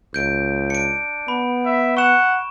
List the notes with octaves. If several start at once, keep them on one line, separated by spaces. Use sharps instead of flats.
C#2 G6 D7
D4 C#7 D7
B3 B5
E5
F#5 C#6 E7